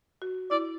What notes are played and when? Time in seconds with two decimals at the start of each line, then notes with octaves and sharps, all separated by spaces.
0.22 F#4
0.51 E4 D5